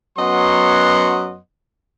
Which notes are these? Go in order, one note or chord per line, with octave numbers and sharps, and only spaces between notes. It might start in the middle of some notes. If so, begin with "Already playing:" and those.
F#2 F#3 B3 D#5 F#5 C6